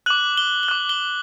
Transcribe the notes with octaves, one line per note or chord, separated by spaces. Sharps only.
D6 F#6 F#7
G7
G7
D6 F#6
G7